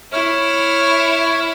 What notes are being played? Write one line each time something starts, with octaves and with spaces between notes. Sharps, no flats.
E4 C#5 F6